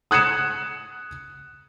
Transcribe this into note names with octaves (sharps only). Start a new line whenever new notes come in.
D#6 F#6 G#6 C#7 E7